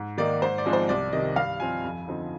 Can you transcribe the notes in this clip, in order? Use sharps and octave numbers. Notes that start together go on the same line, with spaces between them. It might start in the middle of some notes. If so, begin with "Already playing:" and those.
Already playing: G#2
D#3 A#3 D#4 D5
G#2 C5
D5
F3 G#3 C4 D#4
C5
C2 D5
C3 D#3 D#5
G2 F5
F3 C4 G#5
F2
D3 F3 C4 D#4